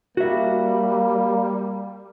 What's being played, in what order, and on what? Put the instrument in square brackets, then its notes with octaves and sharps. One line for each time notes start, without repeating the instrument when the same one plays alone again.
[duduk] G3 [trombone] A#3 [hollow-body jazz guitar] F#4 E5